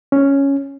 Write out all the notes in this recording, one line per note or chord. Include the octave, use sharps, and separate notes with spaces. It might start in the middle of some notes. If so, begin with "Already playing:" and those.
C#4